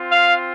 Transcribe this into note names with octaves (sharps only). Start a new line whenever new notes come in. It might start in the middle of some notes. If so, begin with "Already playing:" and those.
Already playing: C4 F4
F5